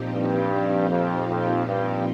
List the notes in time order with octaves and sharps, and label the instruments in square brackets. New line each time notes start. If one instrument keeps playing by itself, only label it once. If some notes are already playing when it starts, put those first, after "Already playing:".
Already playing: [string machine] A#2 F3 C4 D#4 G4
[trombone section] G2
F2
F2
G2